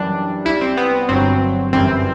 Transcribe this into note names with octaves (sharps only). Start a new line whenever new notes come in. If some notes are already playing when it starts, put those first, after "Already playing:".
Already playing: F#2 E3 G3 D4
C2 C3 G3 E4
C4
B3
G1 G2 F#3 C4
G1 F#2 E3 G3 C4